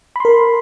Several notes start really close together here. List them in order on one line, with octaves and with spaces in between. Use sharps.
B5 C6 A#4